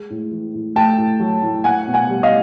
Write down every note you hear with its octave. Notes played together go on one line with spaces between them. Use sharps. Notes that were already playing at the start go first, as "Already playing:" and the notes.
Already playing: G#3
A2
E3
A2
A3 G5 A5
A2
F#3
A2
A#3 F#5 G#5
B2
F#5 G#5
G3
D#5 F5